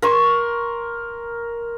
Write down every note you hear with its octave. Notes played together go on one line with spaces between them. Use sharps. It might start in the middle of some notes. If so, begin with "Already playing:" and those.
A#4 C6 C#6